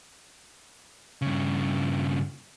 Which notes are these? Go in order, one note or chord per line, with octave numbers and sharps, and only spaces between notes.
G2 C#3